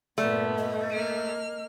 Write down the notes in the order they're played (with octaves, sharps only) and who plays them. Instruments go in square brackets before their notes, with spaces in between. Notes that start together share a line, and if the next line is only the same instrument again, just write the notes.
[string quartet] G2 A#2 B3 [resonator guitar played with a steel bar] A3 [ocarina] D5
[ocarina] D#5
[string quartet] A#3 F6